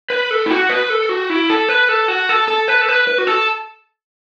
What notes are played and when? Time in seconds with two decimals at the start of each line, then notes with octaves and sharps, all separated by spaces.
0.10 B4
0.31 A4
0.46 E4
0.51 F#4
0.70 B4
0.90 A4
1.09 F#4
1.30 E4
1.50 A4
1.69 B4
1.89 A4
2.08 F#4
2.29 A4
2.48 A4
2.68 B4
2.81 A4
2.89 B4
3.07 B4
3.18 F#4
3.27 A4